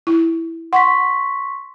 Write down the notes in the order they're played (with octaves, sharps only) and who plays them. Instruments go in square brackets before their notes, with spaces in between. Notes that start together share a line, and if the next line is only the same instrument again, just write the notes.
[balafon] E4
[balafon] F#5 [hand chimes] C6 C#6 B6